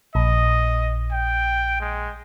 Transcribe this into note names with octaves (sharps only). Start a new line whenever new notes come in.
A#1 D#5
G5
G#3